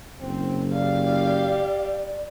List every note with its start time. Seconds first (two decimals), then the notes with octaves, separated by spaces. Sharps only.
0.21 F#1 C4
0.73 G4 D5 F5